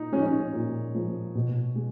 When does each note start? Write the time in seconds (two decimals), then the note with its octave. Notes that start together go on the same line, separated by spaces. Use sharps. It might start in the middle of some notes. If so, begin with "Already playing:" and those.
Already playing: A#2 D#4
0.12 F3 G#3 C#4
0.19 D#4
0.26 C#4
0.53 A#2
0.95 F3 G#3
1.35 B2
1.76 G#3